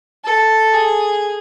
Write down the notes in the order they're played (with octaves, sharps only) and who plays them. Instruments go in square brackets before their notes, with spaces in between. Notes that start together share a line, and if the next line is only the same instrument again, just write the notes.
[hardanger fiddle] A4
G#4